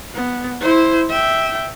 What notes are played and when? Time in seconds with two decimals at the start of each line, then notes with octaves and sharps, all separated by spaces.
0.14 B3
0.61 E4 C5
1.09 E5 G5